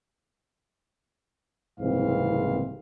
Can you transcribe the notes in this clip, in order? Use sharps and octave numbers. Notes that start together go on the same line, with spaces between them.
F#1 C2 G#2 E3 C4 F5